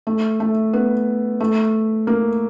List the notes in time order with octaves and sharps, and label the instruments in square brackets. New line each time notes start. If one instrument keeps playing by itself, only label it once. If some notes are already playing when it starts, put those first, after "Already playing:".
[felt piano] A3
A3
B3
A3
A#3